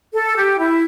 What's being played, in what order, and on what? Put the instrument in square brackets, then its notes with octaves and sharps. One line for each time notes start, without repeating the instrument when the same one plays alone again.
[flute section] A4
G4
E4